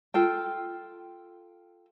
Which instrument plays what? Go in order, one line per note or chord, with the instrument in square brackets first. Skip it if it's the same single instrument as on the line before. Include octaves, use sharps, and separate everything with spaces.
[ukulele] F4 A4 G5